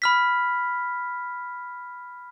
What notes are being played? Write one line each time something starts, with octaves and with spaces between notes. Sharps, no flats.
B5 F6 B6